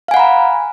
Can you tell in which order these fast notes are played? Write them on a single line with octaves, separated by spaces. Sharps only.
F5 G#5 F#5 B5 A#5